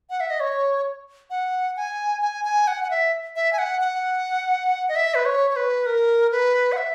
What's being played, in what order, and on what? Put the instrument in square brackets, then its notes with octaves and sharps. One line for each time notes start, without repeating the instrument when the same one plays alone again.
[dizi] F#5
E5
D#5
C#5
F#5
G#5
G#5
G#5
F#5
F#5
E5
E5
G#5
F#5
F#5
D#5
E5
B4
C#5
C#5
B4
A#4
B4
F#5
E5